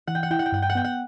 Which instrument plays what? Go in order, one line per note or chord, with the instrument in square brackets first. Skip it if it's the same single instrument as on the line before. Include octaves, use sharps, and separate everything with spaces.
[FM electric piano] E3 [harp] F#5
[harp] G5
F#5
[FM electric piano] E4 [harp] G5
[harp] F#5
G5
[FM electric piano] G2 [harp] F#5
[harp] G5
F#5
[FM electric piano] B3 [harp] G5
[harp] F#5